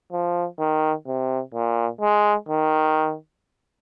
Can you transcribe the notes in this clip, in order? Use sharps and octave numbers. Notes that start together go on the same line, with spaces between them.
F3
D#3
C3
A#2
G#3
D#3